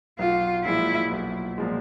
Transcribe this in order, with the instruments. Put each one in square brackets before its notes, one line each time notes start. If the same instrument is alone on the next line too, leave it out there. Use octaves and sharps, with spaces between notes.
[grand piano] B1 [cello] F4
[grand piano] A#2 F3 G#3 [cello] E4
[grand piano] B1
A#2 F3 G#3